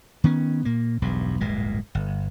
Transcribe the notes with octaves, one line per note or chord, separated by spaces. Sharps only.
D#3 B3 C#4
A#2 A#3
E1 B1 G2
D1 G1 A#2 G#3
G1